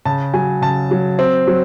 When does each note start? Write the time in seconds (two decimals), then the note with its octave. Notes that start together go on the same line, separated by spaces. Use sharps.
0.05 C#3 A5
0.34 F#3 G#5
0.62 C#3 A5
0.91 F#3
1.19 C4
1.47 F#3